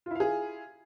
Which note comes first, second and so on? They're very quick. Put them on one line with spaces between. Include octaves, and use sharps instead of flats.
F4 E4 F5 G#4